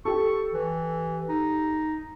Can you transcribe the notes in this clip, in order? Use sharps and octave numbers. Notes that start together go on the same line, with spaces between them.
G4 A4 C#6
E3
D#4